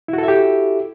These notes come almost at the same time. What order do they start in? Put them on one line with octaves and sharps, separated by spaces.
E4 F#4 A4 E5 G4